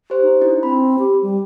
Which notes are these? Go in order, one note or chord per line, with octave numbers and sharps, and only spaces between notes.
G4 C5
D#4
D4 E4
C4 B5
G4
G3